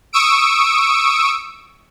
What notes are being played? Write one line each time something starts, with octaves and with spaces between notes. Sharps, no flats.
C#6 D#6 E6 D7